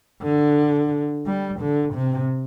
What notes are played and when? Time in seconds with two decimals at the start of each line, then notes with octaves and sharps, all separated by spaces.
0.23 D3
1.26 G3
1.60 D3
1.94 C3